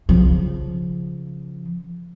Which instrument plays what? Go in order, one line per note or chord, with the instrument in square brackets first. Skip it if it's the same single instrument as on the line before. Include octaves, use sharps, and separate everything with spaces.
[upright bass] C#3 F3